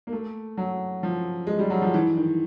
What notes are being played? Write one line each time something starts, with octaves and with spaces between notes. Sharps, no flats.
A#3
A3
F#3
F3
G#3
G3
F#3
F3
E3
D#3